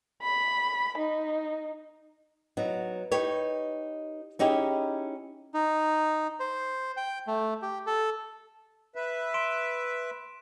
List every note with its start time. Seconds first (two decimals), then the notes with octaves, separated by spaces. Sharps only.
0.22 B5
0.97 D#4
2.57 F#3 B3 D#4
3.12 D#4 G4 B4 C#5
4.39 C#4 D#4 E4 G4 G#4
5.54 D#4
6.40 C5
6.97 G5
7.27 A3
7.62 G4
7.86 A4
8.95 B4 E5
9.34 C6 D7 E7